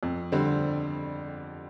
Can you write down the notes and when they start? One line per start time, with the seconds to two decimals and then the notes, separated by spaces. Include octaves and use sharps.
0.03 F2
0.32 D3 G3 C4